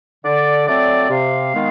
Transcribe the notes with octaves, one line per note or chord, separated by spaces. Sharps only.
D3 D5
F#3 A3 C4 D5
C3 F5
D#3 G#3 B3